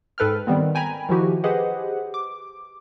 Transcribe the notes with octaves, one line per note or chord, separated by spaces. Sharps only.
G#2 A4 B4 G5 F6
D#3 G3 B3 C4
G5 G#5 A#5 B5
D#3 F3 E4 F#4 G4
G4 G#4 B4 C5 D#5 F#5
D6